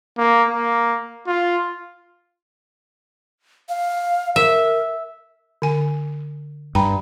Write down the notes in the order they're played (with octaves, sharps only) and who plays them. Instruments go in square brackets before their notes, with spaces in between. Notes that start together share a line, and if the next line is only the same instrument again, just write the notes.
[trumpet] A#3
A#3
F4
[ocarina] F5
[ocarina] A#4 [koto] E5
[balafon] D3 G#5
[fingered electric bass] G2 [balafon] G5 A#5 B5